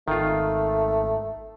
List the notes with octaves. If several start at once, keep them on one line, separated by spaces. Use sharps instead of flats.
G#1 D#3 A3 F4